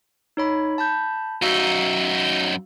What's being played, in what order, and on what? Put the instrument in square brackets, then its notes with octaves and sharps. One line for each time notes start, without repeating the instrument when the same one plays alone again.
[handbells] D#4 C#5 B5
A5 B5 G6
[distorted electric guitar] F#2 D#4 [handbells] F#4 F5 E6